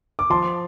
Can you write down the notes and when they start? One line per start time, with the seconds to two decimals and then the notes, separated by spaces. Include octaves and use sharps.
0.19 D6
0.30 F3 A5 C6